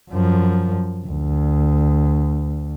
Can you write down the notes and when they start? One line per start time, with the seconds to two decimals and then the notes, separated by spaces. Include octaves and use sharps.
0.11 F#2 F3
1.07 D2